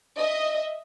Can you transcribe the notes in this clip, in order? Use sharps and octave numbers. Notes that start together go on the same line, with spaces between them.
D#5 E5